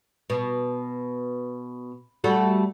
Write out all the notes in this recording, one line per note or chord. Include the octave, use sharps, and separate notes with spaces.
B2
G3 A3 F#4